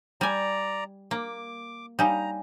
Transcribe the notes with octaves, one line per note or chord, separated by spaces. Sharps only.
G3 D5 G#5 A#5
A#3 D6
G3 D#4 C#5 F5 G#5 A#5